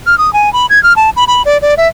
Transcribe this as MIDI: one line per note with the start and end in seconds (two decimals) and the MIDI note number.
0.07 0.18 89
0.18 0.33 87
0.33 0.52 80
0.53 0.66 83
0.70 0.82 92
0.83 0.93 89
0.96 1.10 81
1.16 1.24 83
1.28 1.42 83
1.45 1.58 74
1.62 1.75 74
1.77 1.88 76